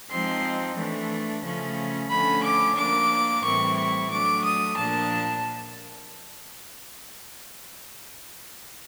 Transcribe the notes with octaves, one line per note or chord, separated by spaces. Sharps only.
F3 G#3 C4 D#4 C6
E3 A3 D4
C#3 F3 A3 C#4
D3 F3 A3 C#4 B5
D6
F3 A#3 D4 D6
A2 E3 G3 C4 E4 C#6
C#6
F#3 A3 D4 D6
D#6
A#2 F3 A#3 D4 A5